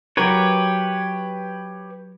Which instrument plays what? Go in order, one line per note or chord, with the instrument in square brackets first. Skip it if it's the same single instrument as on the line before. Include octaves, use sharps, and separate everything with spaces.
[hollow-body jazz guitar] F#3 A#4 [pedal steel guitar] G4 B4 C#5